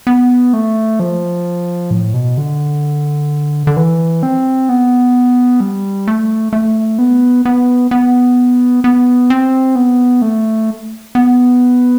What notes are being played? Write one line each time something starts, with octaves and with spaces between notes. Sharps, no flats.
B3
A3
F3
A2
B2
D3
D3
E3
C4
B3
G3
A3
A3
B3
B3
B3
B3
C4
B3
A3
B3